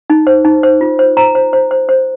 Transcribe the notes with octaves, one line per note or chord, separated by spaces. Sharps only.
D#4
C5
D#4
C5
F4
C5
C5 A#5
C5
C5
C5
C5